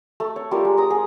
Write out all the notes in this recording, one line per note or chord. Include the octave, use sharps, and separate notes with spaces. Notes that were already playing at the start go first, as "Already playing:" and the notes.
A3
C#5
G3 F4 A#4
G#3
A#5 D#6
G#4